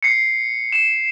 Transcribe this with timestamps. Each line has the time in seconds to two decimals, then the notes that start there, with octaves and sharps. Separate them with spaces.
0.03 C7 C#7
0.73 E7